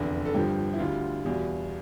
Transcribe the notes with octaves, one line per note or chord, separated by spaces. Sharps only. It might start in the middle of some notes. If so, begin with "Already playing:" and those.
Already playing: F1 E2 D3
A4
G1 G2 F3 G4
E4
D2 D3 G3 F4
E2 B2 G3